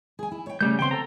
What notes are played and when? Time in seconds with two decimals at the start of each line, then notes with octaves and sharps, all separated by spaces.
0.19 G#4 G#5
0.31 E4
0.47 C#5 G5
0.61 C#3 G3 A3 G6
0.79 C#3 B3 C4 G5 C6
0.91 A4 A#5